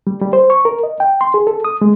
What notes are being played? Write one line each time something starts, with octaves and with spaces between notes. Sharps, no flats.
G3
G3
C5
C#6
A#4
D#5
G5
C6
G#4
A4
D#6
G#3